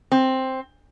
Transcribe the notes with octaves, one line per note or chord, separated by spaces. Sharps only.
C4